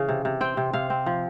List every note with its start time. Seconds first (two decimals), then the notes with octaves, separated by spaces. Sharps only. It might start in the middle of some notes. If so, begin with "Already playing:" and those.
Already playing: C#3 E3 F5
0.09 C3
0.25 C3
0.41 C4 G5
0.57 C3
0.73 C3 F5
0.90 C4
1.06 F3